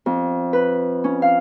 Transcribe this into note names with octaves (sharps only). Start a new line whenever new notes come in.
F2
B4
C#4
F5